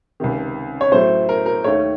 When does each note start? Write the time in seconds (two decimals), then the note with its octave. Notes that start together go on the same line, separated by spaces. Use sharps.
0.20 C#2 C3 D#3
0.81 C#5
0.92 A2 F#3 A3 C5
1.29 A#4
1.46 A#4
1.64 D#2 D#3 A3 C#5